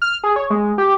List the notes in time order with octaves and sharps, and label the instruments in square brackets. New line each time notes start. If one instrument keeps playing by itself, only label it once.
[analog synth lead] F6
G#4
C#5
G#3
G4